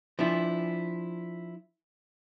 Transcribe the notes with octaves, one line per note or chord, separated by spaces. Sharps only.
F3 D4 E4